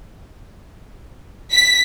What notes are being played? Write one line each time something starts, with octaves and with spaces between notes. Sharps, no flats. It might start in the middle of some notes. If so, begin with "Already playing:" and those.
B6